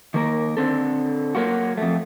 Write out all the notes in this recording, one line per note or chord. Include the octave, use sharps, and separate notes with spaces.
D#3 A#3 A#4
D3 C4 A4
F#3 A#3 F4 F#4
F2 A3